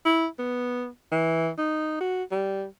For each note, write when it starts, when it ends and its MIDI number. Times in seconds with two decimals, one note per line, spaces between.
0.06 0.26 64
0.39 0.87 59
1.11 1.50 52
1.58 1.99 63
2.01 2.23 66
2.31 2.65 55